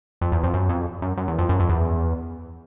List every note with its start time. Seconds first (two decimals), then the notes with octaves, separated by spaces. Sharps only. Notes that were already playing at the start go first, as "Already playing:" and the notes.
0.21 F2
0.32 E2
0.43 F2
0.54 F#2
0.69 F2
1.02 F#2
1.17 F#2
1.28 E2
1.38 F2
1.49 F#2
1.60 F2
1.69 E2